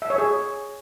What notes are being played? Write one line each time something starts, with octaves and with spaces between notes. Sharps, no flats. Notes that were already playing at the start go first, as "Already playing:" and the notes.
E5
C#5
G#4